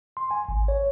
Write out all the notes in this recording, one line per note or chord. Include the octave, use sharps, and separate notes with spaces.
C6
G#5
G#1
C#5